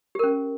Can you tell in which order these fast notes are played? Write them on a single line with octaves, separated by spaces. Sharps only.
G4 A#4 C#4